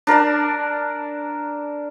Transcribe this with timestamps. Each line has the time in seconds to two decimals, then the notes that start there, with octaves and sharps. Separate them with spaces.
0.07 D4 A#4 D5 A5